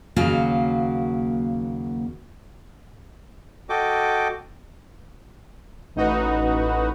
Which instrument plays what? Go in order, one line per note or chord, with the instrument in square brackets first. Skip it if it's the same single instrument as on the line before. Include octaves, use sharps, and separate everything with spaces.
[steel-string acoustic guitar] D#2 C#3 F#3 A#3 F#4 F5
[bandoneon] F#4 A4 D#5 G5 D6
[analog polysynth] A1 D#4 F#4 B4